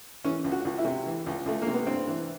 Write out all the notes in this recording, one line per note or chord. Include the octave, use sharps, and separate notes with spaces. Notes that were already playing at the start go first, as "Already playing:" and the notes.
E3 C#4
C#2
F#4
C#2
E4
C3
E3
C#2
C#2 A3
A#3
C3
B3
G2 C4
E3